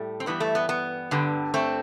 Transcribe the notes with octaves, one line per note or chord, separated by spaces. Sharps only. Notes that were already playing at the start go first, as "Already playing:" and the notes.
Already playing: A2 G3 A3
C4
G2 E3 G3 B3
A3
B3
B3
G2 D3 G3
A3 C4